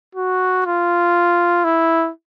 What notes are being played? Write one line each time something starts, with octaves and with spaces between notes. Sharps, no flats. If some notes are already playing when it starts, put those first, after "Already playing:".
F#4
F4
E4